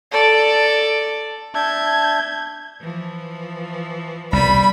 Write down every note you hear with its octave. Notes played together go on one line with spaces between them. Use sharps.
A4 D5
D4 E5 A5 G6 G#6
E3 F3
C2 B2 G3 B5